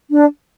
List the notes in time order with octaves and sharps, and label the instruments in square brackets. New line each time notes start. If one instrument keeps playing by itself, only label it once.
[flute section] D4